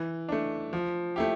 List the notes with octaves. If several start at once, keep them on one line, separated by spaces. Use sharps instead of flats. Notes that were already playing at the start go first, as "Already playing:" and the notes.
Already playing: E3
A3 D4
F3
A3 E4 G4